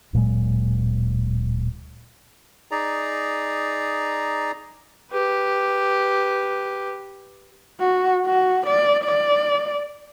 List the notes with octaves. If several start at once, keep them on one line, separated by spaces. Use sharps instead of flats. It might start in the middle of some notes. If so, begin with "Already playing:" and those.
D1 A#2 F#3 G#3
D#4 G#4 D5 A#5
G4 B4
F#4
F#4
D5
D5